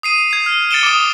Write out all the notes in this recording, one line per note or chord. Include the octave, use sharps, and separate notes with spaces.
D#6 C7 D#7
G#6 C7
F6
F6 A6 C#7 D7 E7 G7
D6 D#6